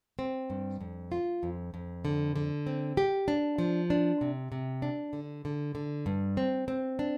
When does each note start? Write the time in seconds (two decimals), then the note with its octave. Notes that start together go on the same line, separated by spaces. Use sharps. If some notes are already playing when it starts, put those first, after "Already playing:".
0.19 C4
0.50 G2
0.81 F2
1.12 F4
1.43 F2
1.74 F2
2.05 D3
2.36 D3
2.67 C4
2.97 G4
3.28 D4
3.58 F3
3.90 D4
4.21 C3
4.52 C3
4.82 D4
5.13 D3
5.45 D3
5.75 D3
6.06 G2
6.37 C4
6.68 C4
6.99 D4